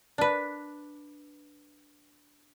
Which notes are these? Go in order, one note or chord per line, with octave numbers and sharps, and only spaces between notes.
D4 B4